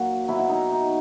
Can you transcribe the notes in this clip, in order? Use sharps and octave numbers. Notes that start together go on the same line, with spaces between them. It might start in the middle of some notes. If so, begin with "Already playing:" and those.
Already playing: A#2 F#3 F#4
B2 F#3 E4
E4
D#4
D#4